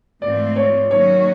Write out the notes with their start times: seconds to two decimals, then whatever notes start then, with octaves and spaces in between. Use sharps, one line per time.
0.22 G#2 E3 A3 C4 F4 D5
0.56 C#5
0.91 D#3 F#3 A#3 C#4 F#4 C#5